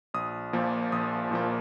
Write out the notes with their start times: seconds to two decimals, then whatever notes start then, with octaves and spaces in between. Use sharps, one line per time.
0.14 A#1 D#6
0.53 A#2 F3 A#3
0.92 A#1 D#6
1.31 A#2 F3 A#3